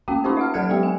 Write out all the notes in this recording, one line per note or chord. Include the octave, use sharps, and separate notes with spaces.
A3 A#3 C#4 F#4 G5
C#4 D#4 F4 G4 C5
E5 F#5 F6
F#3 A4 F#5 F#6 G#6 C#7
F#3 G#3 B3 G4
G#5